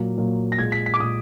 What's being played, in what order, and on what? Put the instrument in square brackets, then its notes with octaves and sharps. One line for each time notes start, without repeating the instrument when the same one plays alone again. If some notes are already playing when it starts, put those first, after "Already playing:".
Already playing: [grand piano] A#2 F#3 A#3
A#2 F#3 A#3
A#6
A#2 G#3 G#6
B6
B6
D6
A#2 G#3 D#6